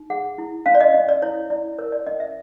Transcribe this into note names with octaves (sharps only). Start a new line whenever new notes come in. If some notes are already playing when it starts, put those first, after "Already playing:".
Already playing: D#4
G#4 F#5
E4
C#4 F5
D5
D#5
C#4 D#5
D5
E4 C#5
E4 D5
A#4 C#5
D5
C#4 D#5
E5